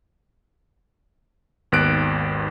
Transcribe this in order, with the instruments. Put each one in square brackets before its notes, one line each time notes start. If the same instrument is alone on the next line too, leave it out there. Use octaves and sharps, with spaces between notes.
[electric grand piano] G#1 D#2 B3 F#6 D7